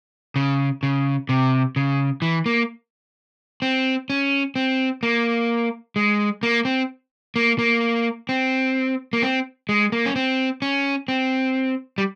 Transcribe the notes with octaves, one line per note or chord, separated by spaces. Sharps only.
C#3
C#3
C3
C#3
E3
A#3
C4
C#4
C4
A#3
G#3
A#3
C4
A#3
A#3
C4
A#3
C4
G#3
A#3
C#4
C4
C#4
C4
G3